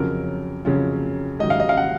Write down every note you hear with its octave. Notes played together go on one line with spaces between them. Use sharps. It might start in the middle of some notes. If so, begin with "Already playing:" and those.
Already playing: F2 C#3 F#3 C#4 F4 A#4
F2 C#3 F#3 C#4 F4
G#2 D#3 F#3 D#5
F5
D#5
F5
F#5